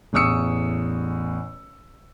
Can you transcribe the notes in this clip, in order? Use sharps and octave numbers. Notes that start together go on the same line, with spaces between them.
A1 E2 C#6 D#6 E6 C#7